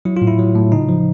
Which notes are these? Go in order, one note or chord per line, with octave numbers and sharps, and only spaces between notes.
F#3 E4
F4
A2
E4
F#3
A2
C#3 D#4
F3